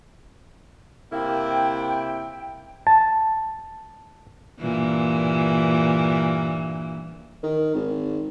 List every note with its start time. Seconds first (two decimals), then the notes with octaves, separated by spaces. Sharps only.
1.12 C3 A#3 E4 G5
2.87 A5
4.60 G2 A#2 E3
7.43 D#3
7.75 G#1